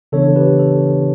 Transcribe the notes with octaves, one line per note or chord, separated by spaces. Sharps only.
C#3 E3 B3 D4 A4 C#5
G4 B4
A4